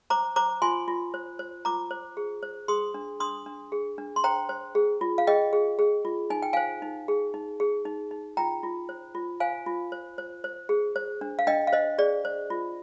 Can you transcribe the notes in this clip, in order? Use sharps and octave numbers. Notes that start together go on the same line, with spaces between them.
C5 A#5 D6
C5 A#5 D6
F4 G#5 C6
F4
C5
C5
F4 A#5 D6
C5
G#4
C5
G#4 C6 D#6
D4
D4 C6 D#6
D4
G#4
D4
C6
C5 G5 A#5
C5
G#4
F4
F5
G#4 D#5 G5
G#4
G#4
F4
D#4 G#5
G5
C5 F5 G#5
D#4
G#4
D#4
G#4
D#4
D#4
F4 G5 A#5
F4
C5
F4
C5 F5 G#5
F4
C5
C5
C5
G#4
C5
D4
F5
D4 D#5 G5
F5
C5 D#5
G#4 D5
C5
F4